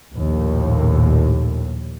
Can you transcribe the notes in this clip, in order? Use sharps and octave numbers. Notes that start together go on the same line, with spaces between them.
A#1 D#2 A2